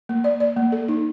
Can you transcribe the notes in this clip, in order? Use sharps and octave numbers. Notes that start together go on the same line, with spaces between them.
A#3
D5
D5
A#3
A4
D#4